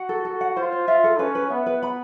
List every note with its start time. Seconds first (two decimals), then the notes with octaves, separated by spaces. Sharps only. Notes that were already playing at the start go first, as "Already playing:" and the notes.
Already playing: F#4 F#5
0.09 A4
0.25 A4
0.41 F#5
0.56 F4 C5
0.72 C5
0.88 F4 E5
1.04 A4
1.19 C#4 B4
1.35 B4
1.50 B3 E5
1.66 B4
1.82 B5